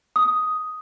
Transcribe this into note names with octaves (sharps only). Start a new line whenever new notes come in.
D#6